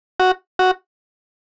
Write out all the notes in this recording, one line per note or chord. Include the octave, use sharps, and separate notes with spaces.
F#4
F#4